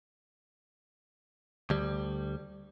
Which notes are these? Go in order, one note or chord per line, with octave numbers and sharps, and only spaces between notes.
D2 G3